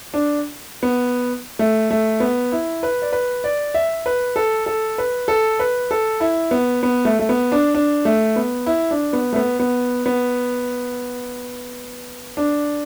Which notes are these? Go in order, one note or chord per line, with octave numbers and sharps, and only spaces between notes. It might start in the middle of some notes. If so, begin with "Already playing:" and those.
D4
B3
A3
A3
B3
E4
B4
D5
B4
D5
E5
B4
A4
A4
B4
A4
B4
A4
E4
B3
B3
A3
A3
B3
D4
D4
A3
B3
E4
D4
B3
A3
B3
B3
B3
D4